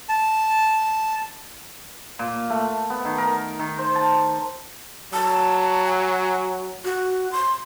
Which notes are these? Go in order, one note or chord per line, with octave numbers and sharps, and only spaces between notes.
A5
A#2
A3
B3
D#3
A#4
D#3
C5
A5
F#3 A5
G#5
F#4
C6